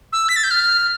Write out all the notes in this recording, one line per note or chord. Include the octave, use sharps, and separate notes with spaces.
E6
B6
A6
G6
F6